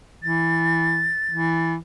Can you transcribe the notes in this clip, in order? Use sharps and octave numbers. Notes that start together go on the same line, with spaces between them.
E3 A6
E3